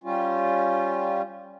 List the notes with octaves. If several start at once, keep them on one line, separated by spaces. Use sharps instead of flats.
G3 C#4 F4